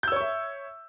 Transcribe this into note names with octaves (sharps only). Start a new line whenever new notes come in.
C#5 E5 C#6 E6 G6